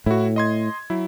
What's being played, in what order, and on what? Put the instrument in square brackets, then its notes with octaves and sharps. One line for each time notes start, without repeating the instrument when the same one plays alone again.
[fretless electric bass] A2 [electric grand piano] E4 F#4
[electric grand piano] D#5 C6 G#6
F#3 E4